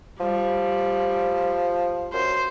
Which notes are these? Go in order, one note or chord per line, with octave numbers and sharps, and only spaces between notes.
F3 G3
F#2 C5